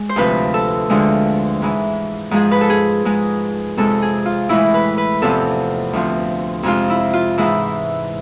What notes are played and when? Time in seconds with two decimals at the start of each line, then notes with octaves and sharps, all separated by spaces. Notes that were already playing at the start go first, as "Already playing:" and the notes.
Already playing: G#3
0.09 C5
0.16 D2 C3 F3 B4
0.54 A4
0.90 D2 D3 F3 G#3
1.62 G#2 E3 G#3
2.31 G#2 F3 G#3 G#4
2.51 B4
2.61 A4
2.70 G#4
3.05 G#2 G#3
3.77 F2 C3 G#3 A4
4.02 G#4
4.26 F4
4.49 A2 E3 G#3 E4
4.74 B4
4.98 B4
5.22 E2 C3 F3 A4
5.93 D2 C3 F3
6.63 F2 C3 G#3 F4
6.90 E4
7.14 F4
7.38 G#2 E3 G#3 E4